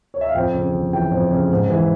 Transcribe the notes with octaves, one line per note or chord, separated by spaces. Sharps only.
C#5
E5
F5
F2 G5
C#3
G1
E3 G5
F2
C#3
G#2
E3